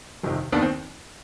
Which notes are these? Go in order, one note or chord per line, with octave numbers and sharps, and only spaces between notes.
G1 F2 C3 D#3
D#2 D#3 B3 D4
C4